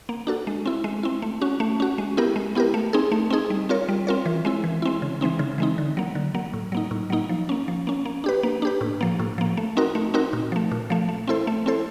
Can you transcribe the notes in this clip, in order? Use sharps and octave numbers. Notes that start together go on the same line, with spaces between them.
A#3
D4 F#4 A4
G#3
C4 E4
G#3
C4 E4
A3
C#4 F#4
A3
C#4 F#4
G#3
B3 E4 G4 A#4
G#3
B3 E4 G4 A#4
A3
C4 D#4 G#4
A3
C4 D#4 G#4
G3
C4 F4 A#4 C#5
G3
C4 F4 A#4 C#5
E3
G#3 C4 E4
E3
G#3 C4 E4
C#3
E3 G#3 C4 D#4
C#3
E3 G#3 C4 D#4
D3
F#3 A#3
D3
F#3 A#3
A2
F#3 A#3 D#4
A2
F#3 A#3 D#4
F3
A#3 C#4
F3
A#3 C#4
A#3
D4 G4 B4
A#3
D4 G4 B4
A2
F3 A#3
A2
F3 A#3
A3
C4 D#4 F#4 A#4
A3
C4 D#4 F#4 A#4
A#2
F3 A3
A#2
F3 A3
A3
C4 E4 A4 C5
A3
C4 E4 A4 C5